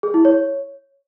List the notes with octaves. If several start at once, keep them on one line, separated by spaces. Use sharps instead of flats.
G#4
E4
C#5